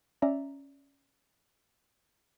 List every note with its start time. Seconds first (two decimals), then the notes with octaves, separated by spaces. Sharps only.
0.22 C#4 D5 E5 A#5